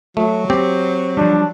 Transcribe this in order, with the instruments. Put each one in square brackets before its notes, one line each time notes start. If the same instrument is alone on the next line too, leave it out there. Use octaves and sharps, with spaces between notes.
[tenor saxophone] F#3 [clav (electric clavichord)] A3
[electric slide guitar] C4 [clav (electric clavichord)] G4
[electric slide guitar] F3 G3 [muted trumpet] D4